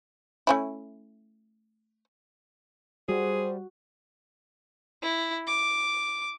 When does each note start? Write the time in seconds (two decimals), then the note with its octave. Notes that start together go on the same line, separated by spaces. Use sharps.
0.47 A3 C#4 E4
3.09 G3 F#4 G#4 C5
5.03 E4
5.47 D6